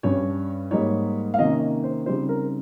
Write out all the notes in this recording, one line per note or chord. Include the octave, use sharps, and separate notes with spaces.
G2 G3 C#4 C#5
G#2 G3 A#3 D#4 C#5
F5
C3 D#3 A#3 C#4 D#5
C5
C#3 G3 C4 D#4 C5
A#4